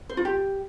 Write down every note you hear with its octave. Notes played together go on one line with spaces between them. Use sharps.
C5
F4
G4